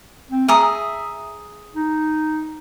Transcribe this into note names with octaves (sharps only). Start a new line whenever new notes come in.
C4
G#4 E5 A#5 D#6
D#4